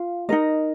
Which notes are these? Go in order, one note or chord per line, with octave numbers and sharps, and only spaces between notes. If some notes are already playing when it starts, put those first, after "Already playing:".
Already playing: F4 F5
D#4 A#4 D#5